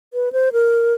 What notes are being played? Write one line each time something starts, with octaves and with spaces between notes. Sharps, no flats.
B4
C5
A#4